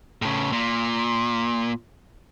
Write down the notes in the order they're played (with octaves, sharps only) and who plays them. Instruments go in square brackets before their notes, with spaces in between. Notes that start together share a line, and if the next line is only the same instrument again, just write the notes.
[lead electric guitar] A2 C#3
A#2